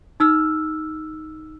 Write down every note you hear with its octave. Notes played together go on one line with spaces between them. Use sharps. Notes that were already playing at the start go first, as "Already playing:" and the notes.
D#4 E6 F6